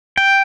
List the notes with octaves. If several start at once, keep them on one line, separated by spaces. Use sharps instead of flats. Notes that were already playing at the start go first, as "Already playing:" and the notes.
G5